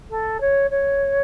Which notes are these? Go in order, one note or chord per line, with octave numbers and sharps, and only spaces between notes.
A4
C#5
C#5